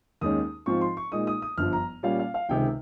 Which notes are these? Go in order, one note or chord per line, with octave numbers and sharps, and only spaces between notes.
D#2 D#3 G#3 C#4 D#6
G#2 F3 C4 F4 C#6
C6
C#6
A#2 G#3 D#4 D#6
D#6
D#6
G1 G2 F3 F6
A#5
A#2 G3 C#4 F4 F5
F5
F5
C#2 C3 D#3 G#3 G5